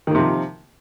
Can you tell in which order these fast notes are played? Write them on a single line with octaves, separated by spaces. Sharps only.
D#3 A#3 C3 F3